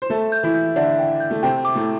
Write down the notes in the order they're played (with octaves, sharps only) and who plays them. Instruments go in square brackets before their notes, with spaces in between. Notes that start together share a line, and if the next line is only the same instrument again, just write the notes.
[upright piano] C5
[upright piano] A3 A4 [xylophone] E5
[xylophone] G6
[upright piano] E3 E4
[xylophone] G6
[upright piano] D3 D4 [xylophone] E5
[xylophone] G5
G6
[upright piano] A3
[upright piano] C3 C4 [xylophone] G5
[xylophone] D6
[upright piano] A2 A3